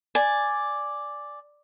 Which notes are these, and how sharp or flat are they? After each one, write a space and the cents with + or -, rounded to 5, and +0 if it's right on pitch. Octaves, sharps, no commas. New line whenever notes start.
D5 +0 G#5 +0